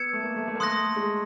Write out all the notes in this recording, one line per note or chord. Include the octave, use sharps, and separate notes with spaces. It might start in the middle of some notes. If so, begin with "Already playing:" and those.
Already playing: B3 E6 G#6 C#7 E7
A3
A#3
A3
A3
A#3
A3 C6 D#6 F#6 A#6
G#3